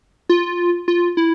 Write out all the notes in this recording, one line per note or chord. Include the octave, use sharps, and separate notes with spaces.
F4
F4
E4